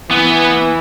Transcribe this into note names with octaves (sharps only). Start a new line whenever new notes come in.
E3 B3